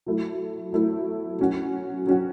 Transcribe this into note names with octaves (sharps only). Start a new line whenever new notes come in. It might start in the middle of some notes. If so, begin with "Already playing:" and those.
F#3 A3 E4
F#3 A3 E4
F#3 C#4 F#4
F#3 C#4 F#4